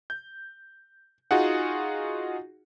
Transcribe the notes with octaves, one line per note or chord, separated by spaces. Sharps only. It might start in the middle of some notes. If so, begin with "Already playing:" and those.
G6
D#4 F4 F#4 G#4 F#5